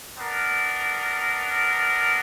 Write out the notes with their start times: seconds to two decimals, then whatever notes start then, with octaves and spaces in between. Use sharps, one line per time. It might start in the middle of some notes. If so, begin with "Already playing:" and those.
0.17 B3 D4 A#4